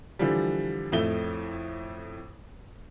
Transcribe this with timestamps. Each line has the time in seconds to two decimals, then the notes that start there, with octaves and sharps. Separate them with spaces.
0.19 D3 E3 F3 G3
0.92 F2 A2 A3 G7